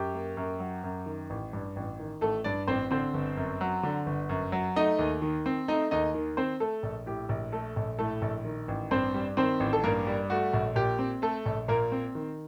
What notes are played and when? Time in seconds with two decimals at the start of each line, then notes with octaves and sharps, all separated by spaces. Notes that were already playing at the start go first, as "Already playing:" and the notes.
Already playing: F#2 G4
0.14 A#3
0.37 F#2
0.60 F#3
0.83 F#2
1.06 D#3
1.30 A1
1.53 G2
1.76 A1
1.99 D#3
2.21 A1 A3 A4
2.44 G2 D4 D5
2.67 A1 C4 C5
2.91 D3 C4 C5
3.14 G1
3.37 F#2
3.61 F#3
3.83 D3
4.06 G1
4.29 F#2
4.52 F#3
4.76 A3 D#4 D#5
4.99 D#2
5.22 D#3
5.46 C4
5.68 A3 D#4 D#5
5.91 D#2 D#4 D#5
6.15 D#3
6.37 C4 C5
6.60 A3 A4
6.83 A#1
7.06 A2 G4
7.29 A#1
7.52 A3 A4
7.76 A#1
7.99 A2 A3 A4
8.22 A#1
8.45 D#3
8.68 A1
8.91 G2 C4 C5
9.14 G3
9.37 D#3 C4 C5
9.60 A1
9.73 A4
9.84 G2 A#3 A#4
10.07 G3
10.30 A3 F#4
10.54 A#1
10.76 A#2 G4
10.99 C4
11.22 A3 A4
11.46 A#1
11.68 A#2 A#3 A#4
11.92 C4
12.15 D#3